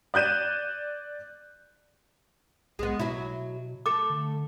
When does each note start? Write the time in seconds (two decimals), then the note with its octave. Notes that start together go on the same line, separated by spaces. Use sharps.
0.14 D5 F#6 G6 D#7 E7
2.79 B1 G#3 B3
2.99 B2 F#3 E4
3.86 A3 A4 D6
4.10 D3